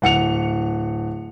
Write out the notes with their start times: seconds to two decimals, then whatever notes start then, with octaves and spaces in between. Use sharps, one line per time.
0.02 D1 F#5 C#7 F7